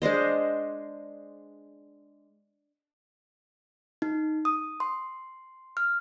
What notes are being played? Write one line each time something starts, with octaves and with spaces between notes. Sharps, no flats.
G#3 D4 C5 D#5
D#4
D#6
C6
F6